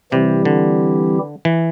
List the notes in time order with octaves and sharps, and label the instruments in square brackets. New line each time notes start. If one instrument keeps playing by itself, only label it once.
[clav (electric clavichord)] C3 [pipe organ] E3 G3 C4 E4 G4
[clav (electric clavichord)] D3
E3